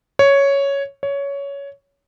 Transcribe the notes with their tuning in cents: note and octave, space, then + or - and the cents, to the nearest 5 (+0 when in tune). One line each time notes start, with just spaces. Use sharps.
C#5 +5
C#5 +15